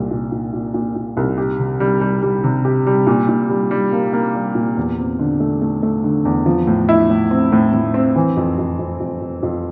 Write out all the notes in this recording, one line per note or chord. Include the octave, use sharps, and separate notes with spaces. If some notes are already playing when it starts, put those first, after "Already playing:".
Already playing: C2 A#2
A#2
A#2
A#2
A#2
A#2
C2
G4
C3
G3
G3
G3
C3
G4
G3
A#2
A#2
G3
G3
A#3
A#3
G3
A#2
E2
C4
D3
A3
A3
A3
D3
E2
F3
A2
E4
A2
C4
A2
A2
C4
E3
F2
F2
F2
F2
F2
F2